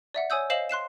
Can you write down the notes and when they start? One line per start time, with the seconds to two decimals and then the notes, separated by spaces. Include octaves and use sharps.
0.14 D5 E5 F#5
0.30 C#5 G#5 D#6 E6 G6
0.50 C5 D#5 F5 C7 E7 F#7
0.69 C6 F#6 C7 E7